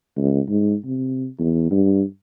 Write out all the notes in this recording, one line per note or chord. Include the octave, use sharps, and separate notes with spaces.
C#2
G#2
C3
E2
G2